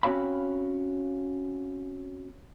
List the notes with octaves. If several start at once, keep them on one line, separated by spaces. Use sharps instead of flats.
C4 C#4 F#4 C#5 F5 B5